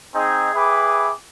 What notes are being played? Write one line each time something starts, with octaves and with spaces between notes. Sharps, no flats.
C4 D#4 G#4
G4 G#4 B4 E5 B5 D6